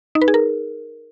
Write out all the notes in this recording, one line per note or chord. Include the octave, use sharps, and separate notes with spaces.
D#4
B4
G#4
A#4